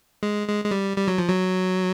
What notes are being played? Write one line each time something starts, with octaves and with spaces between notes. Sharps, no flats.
G#3
G#3
G#3
G3
G3
F#3
F3
F#3